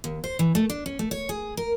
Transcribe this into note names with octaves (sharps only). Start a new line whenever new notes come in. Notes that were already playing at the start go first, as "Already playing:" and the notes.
D#2
C5
E3
A3
D4
C#4
A3
C#5
G#4
A#4